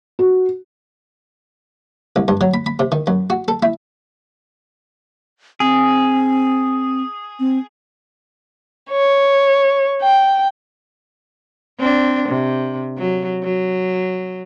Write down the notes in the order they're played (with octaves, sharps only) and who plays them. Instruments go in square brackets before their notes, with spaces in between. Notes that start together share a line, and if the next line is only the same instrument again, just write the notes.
[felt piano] F#4
[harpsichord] C2
G2
F#3
B5
B5
C3
D#3
F#2
F#4
A4
E4
[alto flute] C4 [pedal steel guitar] G#4
[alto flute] C4
[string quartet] C#5
G5
[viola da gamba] C4 D4
C3
F#3
F#3